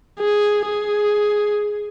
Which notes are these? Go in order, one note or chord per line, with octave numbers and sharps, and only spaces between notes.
G#4
G#4